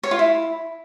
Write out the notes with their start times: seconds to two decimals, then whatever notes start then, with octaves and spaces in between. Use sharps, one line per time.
0.03 C#5
0.11 F4
0.19 E4